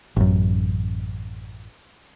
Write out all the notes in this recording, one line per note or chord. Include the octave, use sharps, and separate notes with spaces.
A1 F#2